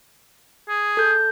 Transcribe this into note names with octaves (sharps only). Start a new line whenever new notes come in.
G#4
A4 G6